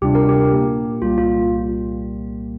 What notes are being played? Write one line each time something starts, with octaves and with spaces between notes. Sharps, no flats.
D2 C3 G3 D4 F4 G4
A#4
G4
A#2 A#3 G4
C2 A#2 G3 A#3 F4 G4
F4